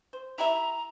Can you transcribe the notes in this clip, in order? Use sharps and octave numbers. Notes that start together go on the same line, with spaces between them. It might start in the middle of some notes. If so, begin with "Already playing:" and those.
C5
E4 G4 E5 A#5